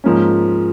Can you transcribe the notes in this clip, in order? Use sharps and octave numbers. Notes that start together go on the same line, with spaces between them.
G#2 F3 A#3 C#4